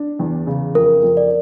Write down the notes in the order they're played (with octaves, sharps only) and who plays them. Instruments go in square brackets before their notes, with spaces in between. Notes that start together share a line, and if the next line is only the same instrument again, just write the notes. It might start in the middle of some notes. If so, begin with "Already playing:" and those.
Already playing: [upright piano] D4
E2
C#3
[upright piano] F2 [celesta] A#4
[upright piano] F2
[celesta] D5